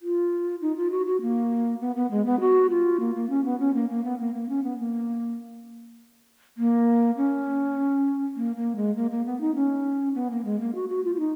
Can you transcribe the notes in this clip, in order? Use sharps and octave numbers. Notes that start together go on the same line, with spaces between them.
F4
D#4
F4
F#4
F#4
A#3
B3
B3
G#3
B3
F#4
F4
A#3
A#3
C#4
B3
C#4
A#3
A#3
B3
A#3
A#3
C#4
B3
A#3
A#3
C#4
A#3
A#3
G#3
A#3
A#3
B3
D#4
C#4
B3
A#3
G#3
A#3
F#4
F#4
F4
F4
D#4